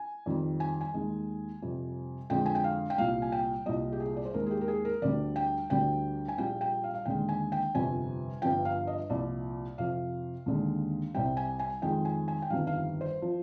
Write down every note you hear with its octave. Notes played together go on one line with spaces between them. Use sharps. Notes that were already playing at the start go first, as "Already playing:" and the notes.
Already playing: G#5
F2 D#3 G3
G#5
G#5
D#2 D#3 G#3
F2 C3 G3
F2 D3 G#3 G5
G#5
G5
F5
G5
C2 A#2 G3 F5
G#5
G5
C2 A#2 G3 D#5
G4
G#4
D5
C5
D#2 D#3 G#3 A#4
G#4
G4
A#4
G#4
A#4
D2 D3 G3 D5
G5
D2 D3 G3 G5
G#5
A#1 A#2 G3 G5
G5
F5
F5
D#2 D3 G#3 G5
G#5
G5
G1 F2 C3 G3 G#5
G1 G2 F3 G5
F5
D#5
C2 A#2 F3 D5
F2 C3 F3 F5
D#2 D3 G#3
C2 C3 G3 G5
G#5
G#5
F2 D#3 G#3 G5
G#5
G#5
G5
G1 F2 D#3 G3 F5
F5
C5
F3